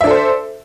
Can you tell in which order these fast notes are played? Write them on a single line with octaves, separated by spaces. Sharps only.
E5 D4 A4 C5